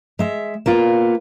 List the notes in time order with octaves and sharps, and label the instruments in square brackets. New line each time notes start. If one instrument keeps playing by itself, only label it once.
[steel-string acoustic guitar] G#3 E5
A#3 B3 F4